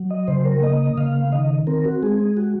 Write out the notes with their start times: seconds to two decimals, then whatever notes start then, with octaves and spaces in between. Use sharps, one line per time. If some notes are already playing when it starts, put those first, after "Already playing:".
Already playing: F#3
0.10 D#5
0.27 C#3 C5
0.45 A#4
0.62 A#3 D#5
0.97 C#3 F5
1.32 D#3 D#5
1.67 C4 A#4
1.85 F#4
2.03 G#3 G#4
2.37 F#4